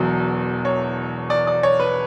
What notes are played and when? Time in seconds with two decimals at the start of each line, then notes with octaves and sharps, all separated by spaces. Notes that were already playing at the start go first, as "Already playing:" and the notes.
Already playing: E1 E2 B2 F#3
0.65 C#5
1.30 D5
1.47 D5
1.63 C#5
1.80 B4